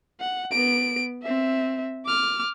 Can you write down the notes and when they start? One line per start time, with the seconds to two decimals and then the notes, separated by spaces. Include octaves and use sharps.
0.20 F#5
0.52 B3 D7
1.23 C4 E5
2.06 D6 F6